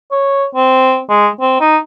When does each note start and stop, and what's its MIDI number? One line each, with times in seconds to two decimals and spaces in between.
0.12 0.45 73
0.55 1.00 60
1.09 1.28 56
1.41 1.59 60
1.60 1.77 63